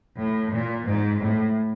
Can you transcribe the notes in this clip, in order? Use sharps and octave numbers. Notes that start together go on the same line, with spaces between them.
A2
A#2
G#2
A2